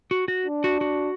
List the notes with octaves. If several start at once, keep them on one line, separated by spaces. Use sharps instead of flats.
F#4
F#4
D4
F#4
F#4